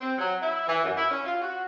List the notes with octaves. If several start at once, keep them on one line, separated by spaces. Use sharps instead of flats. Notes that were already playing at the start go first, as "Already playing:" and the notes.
C4
F#3
E4
E3
F#2
E4
C#4
F4
F#4